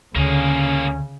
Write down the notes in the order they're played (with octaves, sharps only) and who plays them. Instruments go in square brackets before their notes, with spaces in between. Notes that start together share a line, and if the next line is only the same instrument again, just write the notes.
[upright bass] D2 [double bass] C#3 [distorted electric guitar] A#3 G#4 [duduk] C#4